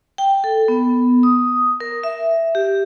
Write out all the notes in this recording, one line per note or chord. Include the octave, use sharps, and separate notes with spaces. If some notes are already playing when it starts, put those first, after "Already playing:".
G5
A4
B3
D#6
A#4
E5
G4